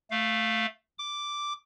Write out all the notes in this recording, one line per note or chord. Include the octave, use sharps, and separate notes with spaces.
A3 F5
D6